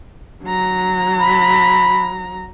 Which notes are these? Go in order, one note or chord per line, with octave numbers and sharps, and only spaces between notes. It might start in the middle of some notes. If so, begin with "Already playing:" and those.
F#3 A#5
B5